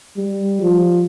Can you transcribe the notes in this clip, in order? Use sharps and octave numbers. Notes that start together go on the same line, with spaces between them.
G3
F3